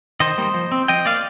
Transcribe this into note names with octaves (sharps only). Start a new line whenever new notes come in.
D#3 C5 D#5
G3 A#3
F3
C4
F3 D#5 G5
A#3 D5 F5